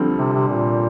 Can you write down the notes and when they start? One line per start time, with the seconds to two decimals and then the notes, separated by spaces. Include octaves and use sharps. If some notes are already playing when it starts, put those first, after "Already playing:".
Already playing: D3 F3 G3 C4
0.18 C3
0.33 C3
0.48 A#2